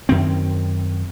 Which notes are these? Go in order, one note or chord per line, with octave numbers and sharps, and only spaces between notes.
F#2 D#3 C4